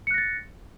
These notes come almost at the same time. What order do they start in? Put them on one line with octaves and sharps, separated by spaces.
C#7 F#6 A#6 A6